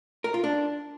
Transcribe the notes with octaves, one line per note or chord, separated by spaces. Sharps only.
A#4
F4
D4